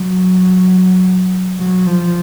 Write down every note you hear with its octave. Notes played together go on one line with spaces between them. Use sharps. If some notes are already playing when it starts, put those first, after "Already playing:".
Already playing: F#3
F#3
F3